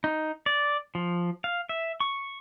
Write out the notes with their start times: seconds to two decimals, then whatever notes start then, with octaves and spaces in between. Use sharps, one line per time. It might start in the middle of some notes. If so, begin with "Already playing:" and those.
0.04 D#4
0.46 D5
0.95 F3
1.44 F5
1.69 E5
2.00 C#6